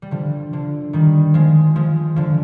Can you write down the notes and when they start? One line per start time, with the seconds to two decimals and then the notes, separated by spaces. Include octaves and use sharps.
0.02 G3
0.11 D3 F3
0.53 D3 F3
0.93 D#3 G3
1.34 F3 G#3
1.76 F3 G#3
2.16 D3 F3